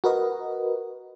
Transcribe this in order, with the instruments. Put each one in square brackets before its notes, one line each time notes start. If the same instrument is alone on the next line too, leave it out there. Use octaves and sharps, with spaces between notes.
[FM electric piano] F#4 A#4 B4 D#5